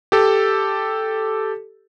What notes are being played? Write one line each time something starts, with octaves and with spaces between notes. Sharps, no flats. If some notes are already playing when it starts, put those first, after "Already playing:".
G4 A4